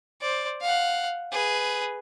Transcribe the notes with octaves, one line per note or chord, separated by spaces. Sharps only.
C5 D5
F5 F#5
G#4 B4